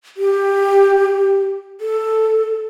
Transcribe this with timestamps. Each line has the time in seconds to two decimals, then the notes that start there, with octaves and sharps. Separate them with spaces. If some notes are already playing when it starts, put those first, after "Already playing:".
0.17 G4
1.81 A4